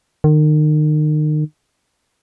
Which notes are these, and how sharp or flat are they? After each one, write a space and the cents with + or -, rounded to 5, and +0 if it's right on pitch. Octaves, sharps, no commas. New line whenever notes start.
D#3 -35